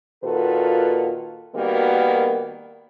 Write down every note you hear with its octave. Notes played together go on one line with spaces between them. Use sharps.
A#2 D#3 F4 F#4 A4 B4
D#3 G3 A#3 B3 F#4 A#4